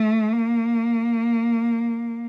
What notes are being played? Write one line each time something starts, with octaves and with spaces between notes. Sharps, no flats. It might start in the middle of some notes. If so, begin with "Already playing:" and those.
Already playing: A3
A#3